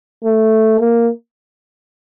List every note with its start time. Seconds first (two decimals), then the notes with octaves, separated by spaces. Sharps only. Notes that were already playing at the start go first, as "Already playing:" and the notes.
0.24 A3
0.80 A#3